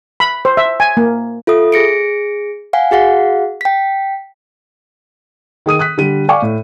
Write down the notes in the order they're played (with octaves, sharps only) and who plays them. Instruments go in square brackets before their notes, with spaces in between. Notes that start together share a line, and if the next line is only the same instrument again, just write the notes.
[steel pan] B5
C5
E5
G#5
A#3
[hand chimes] F4 A4 E5 D#6
G#4 A#6 C#7 D7
F5 F#5 G#5
F#4 G#4 F5 F#5
G5 B6
[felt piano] D#3 G#4 D#6 D#7
D#6 F#6 B6
D3 G3 D#7
D5 F5 G#5 C#6 D6
A2